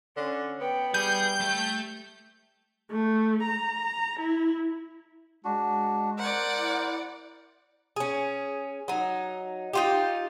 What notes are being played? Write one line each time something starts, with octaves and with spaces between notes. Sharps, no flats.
D3 C#4
B3 G5
G3 G#4 G6
A3 E5
A3
A#5
E4
G#3 D4 F#4
A#4 C5 D5 F#5
E4
C#4 G#4
F#3 D#4
D#4 F4 G4